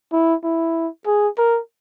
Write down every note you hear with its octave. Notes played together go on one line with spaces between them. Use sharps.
E4
E4
G#4
A#4